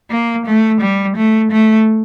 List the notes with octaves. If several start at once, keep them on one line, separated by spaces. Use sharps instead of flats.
A#3
A3
G3
A3
A3